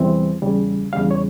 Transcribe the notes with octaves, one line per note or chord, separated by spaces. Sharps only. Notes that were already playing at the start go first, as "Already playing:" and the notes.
Already playing: E2 C3 E3 G3 C4
E2 C#3 G3
E2 C#3 G3 F5
C#5